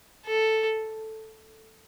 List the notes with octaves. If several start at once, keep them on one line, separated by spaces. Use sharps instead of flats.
A4